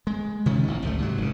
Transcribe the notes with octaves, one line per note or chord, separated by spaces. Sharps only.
G#3
C3 D#3 F3 C#4
A1 A#2
G#1 C#2 F3 A3
G#2 C3 D#3 F#3
F1 C#3